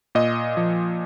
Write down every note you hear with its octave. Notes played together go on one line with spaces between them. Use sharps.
A#2 D#5
F3